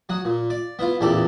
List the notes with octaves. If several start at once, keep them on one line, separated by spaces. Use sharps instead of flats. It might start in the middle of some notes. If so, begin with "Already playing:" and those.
F#3 F#5 D#6
A#2
D5
B3 E4 F4
A1 E2 A#2 G4 A4 D5